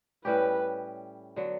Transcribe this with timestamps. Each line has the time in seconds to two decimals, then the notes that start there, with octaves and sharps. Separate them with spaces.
0.25 A2 G3 C#4 G4 B4
1.36 D3 F#3 B3